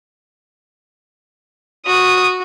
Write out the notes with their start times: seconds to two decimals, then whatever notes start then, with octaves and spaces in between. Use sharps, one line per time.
1.86 F#4 D#6